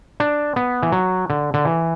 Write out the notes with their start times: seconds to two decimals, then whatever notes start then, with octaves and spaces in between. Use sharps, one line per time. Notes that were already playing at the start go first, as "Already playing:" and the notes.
0.20 D4
0.56 B3
0.83 E3
0.92 F#3
1.30 D3
1.54 D3
1.65 E3